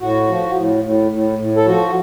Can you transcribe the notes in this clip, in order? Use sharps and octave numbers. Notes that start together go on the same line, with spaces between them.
A2 F#4
F3
A2
A2
A2
A2
A4
F3 F#4